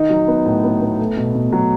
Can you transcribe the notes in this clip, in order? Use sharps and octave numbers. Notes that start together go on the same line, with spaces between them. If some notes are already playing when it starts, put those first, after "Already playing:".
Already playing: D#3 D#4
F#3
B3
A2
B3
B3
A3
B2
B2
F#3